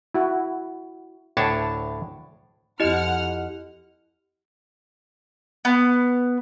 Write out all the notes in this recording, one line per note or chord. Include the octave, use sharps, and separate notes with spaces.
E4 F#4
D2 A2 D4 C#5 A5
F2 E4 G4 D#5 F#5 F6
B3